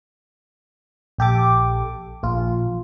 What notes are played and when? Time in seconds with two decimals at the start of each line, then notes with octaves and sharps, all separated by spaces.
1.18 A#1 G4 A4 D6
2.23 A#1 F4